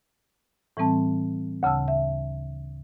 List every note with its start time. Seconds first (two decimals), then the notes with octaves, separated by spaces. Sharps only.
0.77 A2 E3 G3 C4 A5
1.63 D2 C#3 A5 E6
1.88 E5